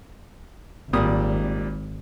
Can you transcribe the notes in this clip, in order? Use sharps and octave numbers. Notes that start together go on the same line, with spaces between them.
G#1 A#2 G3 D#6